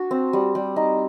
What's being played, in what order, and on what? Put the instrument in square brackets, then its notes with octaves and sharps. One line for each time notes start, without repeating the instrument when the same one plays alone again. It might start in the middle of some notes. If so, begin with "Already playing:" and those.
Already playing: [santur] D4 F#4
C4
G3
G3
D#4